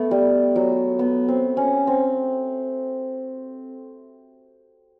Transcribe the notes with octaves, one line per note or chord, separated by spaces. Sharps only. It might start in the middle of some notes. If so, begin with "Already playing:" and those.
Already playing: A3 B3
G3
F#3
B3
C4
C#4
C4